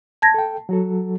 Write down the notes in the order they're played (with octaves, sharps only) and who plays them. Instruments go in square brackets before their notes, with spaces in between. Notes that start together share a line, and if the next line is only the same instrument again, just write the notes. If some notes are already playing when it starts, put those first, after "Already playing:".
[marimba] A5 G#6 A#6
[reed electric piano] A4 G5
F#3 F#4 A4